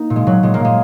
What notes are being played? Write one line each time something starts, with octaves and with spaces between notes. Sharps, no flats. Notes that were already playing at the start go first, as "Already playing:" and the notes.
Already playing: A#3 D#4
A#2
G#3
A#2 F#3
A#2 G#3
A#3
A#2 G#3